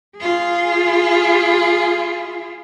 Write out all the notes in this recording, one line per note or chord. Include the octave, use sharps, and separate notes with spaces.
F4 G#4